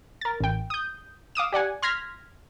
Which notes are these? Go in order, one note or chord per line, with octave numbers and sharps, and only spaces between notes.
A#4 A6
A1 G5
D#6 G6
F5 D6 D#6 E7
G4 D5 F#5 G#5
C6 F6 G#6 A#6 B6